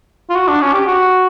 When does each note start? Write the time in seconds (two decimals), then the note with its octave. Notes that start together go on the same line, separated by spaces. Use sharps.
0.30 F4
0.36 F#4
0.48 D4
0.61 C#4
0.73 G4
0.86 F#4